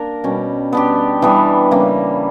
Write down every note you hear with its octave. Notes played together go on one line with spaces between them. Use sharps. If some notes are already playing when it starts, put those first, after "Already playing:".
Already playing: A#3 D4 A#4
B2 G3 C#4
B3 D4 G4
E3 G3 B3 D4
C#3 E3 G3 A#3